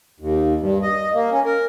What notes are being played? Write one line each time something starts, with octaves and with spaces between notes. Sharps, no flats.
D#2
G2
D#5
A#3
C#4
A#4